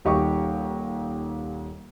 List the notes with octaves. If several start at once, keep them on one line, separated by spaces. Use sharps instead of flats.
D#1 D#2 G4 D#5 C#6 D6